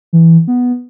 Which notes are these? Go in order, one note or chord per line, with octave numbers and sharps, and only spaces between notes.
E3
B3